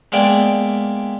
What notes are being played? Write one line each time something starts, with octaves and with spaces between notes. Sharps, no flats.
G#3 A#3 B3 D5 E5 G5